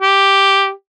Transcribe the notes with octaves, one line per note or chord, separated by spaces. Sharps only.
G4